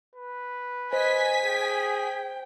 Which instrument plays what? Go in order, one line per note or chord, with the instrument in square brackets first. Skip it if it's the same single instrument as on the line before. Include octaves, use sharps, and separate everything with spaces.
[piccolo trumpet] B4
[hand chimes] C5 [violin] D#5 [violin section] G#5 B6
[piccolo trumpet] G#4 [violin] G5